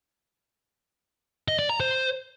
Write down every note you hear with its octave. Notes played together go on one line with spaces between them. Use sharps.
D#5
D5
A#5
C5